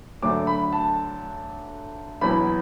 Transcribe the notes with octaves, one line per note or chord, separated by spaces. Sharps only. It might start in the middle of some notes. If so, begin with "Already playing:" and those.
D2 D3 F#3 D4 D6
B5
A5
E2 B2 F#3 B5